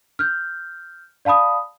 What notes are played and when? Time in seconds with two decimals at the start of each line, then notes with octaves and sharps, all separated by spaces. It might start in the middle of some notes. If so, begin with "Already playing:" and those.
0.19 F6 G6
1.25 D5 F5 A5 B5 D#6